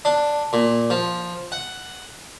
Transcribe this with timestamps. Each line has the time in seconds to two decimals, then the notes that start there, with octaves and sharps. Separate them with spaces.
0.05 D4
0.53 A#2
0.90 F3
1.52 F#5